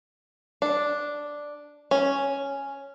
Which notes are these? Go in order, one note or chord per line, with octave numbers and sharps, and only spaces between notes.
D4
C#4